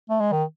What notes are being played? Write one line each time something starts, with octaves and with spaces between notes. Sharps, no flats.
A3
G#3
D#3